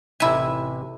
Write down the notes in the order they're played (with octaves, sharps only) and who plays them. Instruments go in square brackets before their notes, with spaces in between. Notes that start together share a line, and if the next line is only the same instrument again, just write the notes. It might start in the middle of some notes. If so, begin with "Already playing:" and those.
[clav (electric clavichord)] A1 C3 E5 [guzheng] E4 G#5